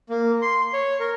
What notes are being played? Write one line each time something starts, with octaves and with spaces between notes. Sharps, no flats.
A#3
C6
C#5
A#4